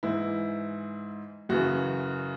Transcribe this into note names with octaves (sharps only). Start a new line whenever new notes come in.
G#2 E3 E4
F#2 C#3 E3 F#4